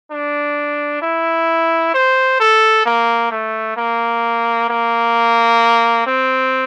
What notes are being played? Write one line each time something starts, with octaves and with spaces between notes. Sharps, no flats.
D4
E4
C5
A4
A#3
A3
A#3
A#3
C4